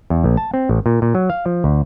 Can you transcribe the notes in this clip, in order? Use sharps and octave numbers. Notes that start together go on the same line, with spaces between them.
E2
A#1
A5
C4
A1
A#2
A#2
F#3
F5
F3
D2